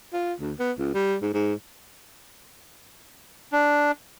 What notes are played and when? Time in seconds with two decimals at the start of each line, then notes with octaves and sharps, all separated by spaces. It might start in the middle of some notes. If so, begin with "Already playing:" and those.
0.13 F4
0.40 D2
0.59 B3
0.79 C#2
0.94 G3
1.22 G#2
1.34 G#2
3.52 D4